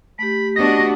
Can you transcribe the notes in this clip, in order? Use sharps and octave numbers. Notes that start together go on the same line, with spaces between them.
A3 G4 B5
B3 D4 F#4 D#5 A#6